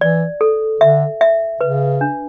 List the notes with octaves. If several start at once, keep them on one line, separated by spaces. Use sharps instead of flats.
E3 D5
A4
D3 E5
E5
C#3 B4
D4